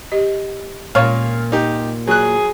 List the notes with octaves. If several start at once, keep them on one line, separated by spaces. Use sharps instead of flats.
G4 D#5
A#2 G#3 C#4 C#5 F5
D#4 G4
F#3 G#4 F#6